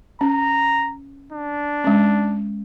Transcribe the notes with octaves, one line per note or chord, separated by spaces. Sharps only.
C#4 A#5
D4
G#3 C#4